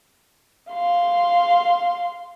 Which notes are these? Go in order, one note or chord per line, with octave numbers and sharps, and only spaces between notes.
F5 C6